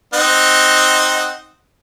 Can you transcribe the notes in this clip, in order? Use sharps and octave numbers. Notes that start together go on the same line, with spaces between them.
C4 D#4 F#5